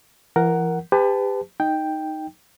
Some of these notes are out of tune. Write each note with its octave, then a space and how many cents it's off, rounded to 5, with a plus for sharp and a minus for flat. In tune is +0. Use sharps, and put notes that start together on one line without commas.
E3 +40 A#4 +0 F#5 +10
G4 +30 B4 +35 A5 -5
D#4 +0 G5 +0